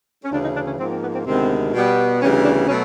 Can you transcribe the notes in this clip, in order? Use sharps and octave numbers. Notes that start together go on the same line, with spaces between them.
C#4
D2 C#3 E3 D4
D#4
D4
C#4
G#2 F3 A#3 C4
C4
B3
C4
D2 C3 D#3 G#3 B3 C4
B2 G3 B3
D2 C#3 E3 G3 B3 C#4
D4
B2 F#3 A3 C#4